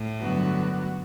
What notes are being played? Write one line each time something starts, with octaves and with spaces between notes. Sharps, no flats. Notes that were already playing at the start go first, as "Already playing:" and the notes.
Already playing: A2
G2 D3 F#3 B3 F#4